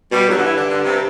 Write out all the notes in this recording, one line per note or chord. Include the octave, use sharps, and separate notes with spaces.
B2 G3
G2 F#3
D3
E3
D3
D3
C3